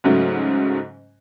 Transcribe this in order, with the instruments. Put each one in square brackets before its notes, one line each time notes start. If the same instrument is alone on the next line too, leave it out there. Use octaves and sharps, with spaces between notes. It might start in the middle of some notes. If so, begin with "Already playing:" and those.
[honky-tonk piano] G#2 C#3 F#3 A3